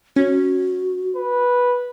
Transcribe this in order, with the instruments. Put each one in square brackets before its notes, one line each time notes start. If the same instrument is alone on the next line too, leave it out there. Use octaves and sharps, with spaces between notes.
[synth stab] C#4 [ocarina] F#4
[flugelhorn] B4